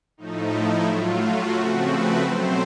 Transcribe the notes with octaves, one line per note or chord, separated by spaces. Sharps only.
A2 F3 A3 D#4
E4
A2 F#3 A3 F4
F#4
C#3 F3 A3 C4
B4
B2 F#3 A3 C4 C5